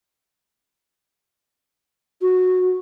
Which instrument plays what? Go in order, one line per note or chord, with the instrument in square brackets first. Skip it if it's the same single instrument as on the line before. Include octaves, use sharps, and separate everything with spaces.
[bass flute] F#4